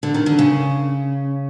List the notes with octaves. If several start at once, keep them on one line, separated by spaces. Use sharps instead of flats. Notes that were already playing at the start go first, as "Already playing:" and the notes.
D3
D#3
D3
C#3